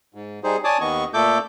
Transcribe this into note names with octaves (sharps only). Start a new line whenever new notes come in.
G#2
G3 D#4 G#4 C5
C#5 D5 G#5 A5 D6 D#6
D#2 D#3 B3 D#5 C#6
A#2 A3 A4 D6 G6